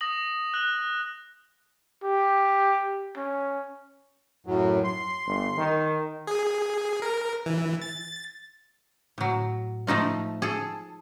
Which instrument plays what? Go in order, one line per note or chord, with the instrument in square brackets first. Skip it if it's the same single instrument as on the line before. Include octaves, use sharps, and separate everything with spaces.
[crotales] D#6 A#6 F#7
F#6 F#7
[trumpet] G4
C#4
[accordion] F#2 A2 F#3
C6
[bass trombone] G1
D#3
[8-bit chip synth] G#4
A#4
E3
A6
[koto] A2 F#3
F3 A3 D#4 F4
G#4 A4